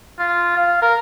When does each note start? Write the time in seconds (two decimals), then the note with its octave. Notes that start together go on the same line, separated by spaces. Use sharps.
0.19 F4
0.56 F5
0.82 A#4